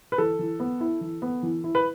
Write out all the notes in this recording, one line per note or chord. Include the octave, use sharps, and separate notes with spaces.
B4
E3 A4
E3
B3
E4
E3
B3
E3
E4
B4